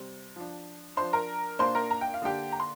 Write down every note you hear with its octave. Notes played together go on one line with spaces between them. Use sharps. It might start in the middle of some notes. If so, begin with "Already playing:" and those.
Already playing: C3 G3 C4
F3 D4
F3 D4 C5 C6
A#4 A#5
A#2 A#3 D4 C5 C6
A#4 A#5
A#5
G5
F5
D3 A#3 D4 G4 G5
A#5
C6